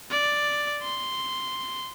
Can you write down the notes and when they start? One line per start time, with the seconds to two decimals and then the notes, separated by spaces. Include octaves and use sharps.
0.11 D5
0.83 C6